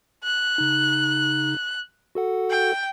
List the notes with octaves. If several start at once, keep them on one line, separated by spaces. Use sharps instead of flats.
F#6
C#3 D#4
F#4 A4 F#5
G5